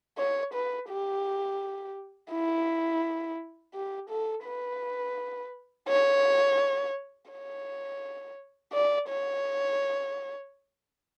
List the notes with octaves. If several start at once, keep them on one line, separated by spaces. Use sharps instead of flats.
C#5
B4
G4
E4
G4
A4
B4
C#5
C#5
D5
C#5